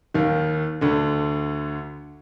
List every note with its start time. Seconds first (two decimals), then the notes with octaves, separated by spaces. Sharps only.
0.14 D#2 D#3
0.81 D2 D3